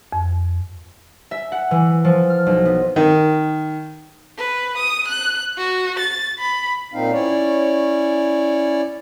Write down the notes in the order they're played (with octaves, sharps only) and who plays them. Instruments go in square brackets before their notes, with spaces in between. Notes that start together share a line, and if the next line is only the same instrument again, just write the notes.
[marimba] F2
[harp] E5
F#5
E3
F3
F6
B1
B3
[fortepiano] D#3
[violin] B4
D#6
F#6
F#4
A6
B5
[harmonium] A#2 C4 D#4 F5
C#4 E4 C#5 D5